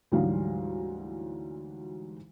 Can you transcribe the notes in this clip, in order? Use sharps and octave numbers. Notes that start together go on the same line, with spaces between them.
D2 G#2 E3 F#3 G3 F5